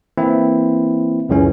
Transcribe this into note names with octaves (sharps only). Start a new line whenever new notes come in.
E3 A#3 C4 E4
C#2 F#2 C#3 E3 C#4